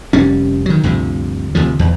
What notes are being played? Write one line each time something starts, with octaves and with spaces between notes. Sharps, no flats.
F1 G3 C#4
D#3 F#3
D2 G2 C3 F3
D2 C3 F3
E2